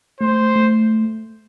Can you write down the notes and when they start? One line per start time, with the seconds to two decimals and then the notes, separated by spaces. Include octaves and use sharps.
0.20 A3 C5
0.56 A3